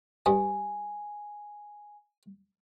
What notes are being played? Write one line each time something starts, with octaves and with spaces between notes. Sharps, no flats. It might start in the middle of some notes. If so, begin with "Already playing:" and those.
G2 G3 G#5 D#6